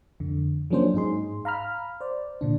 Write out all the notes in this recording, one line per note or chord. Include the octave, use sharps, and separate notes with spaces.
F2 D3
F3 F#3 A#3 C#4 D4 C5
G#2 D#4 G#4 C6
F5 A#5 B5 F6
C5 D5
A#2 D3 D4